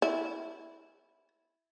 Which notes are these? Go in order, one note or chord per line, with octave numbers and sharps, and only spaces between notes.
E4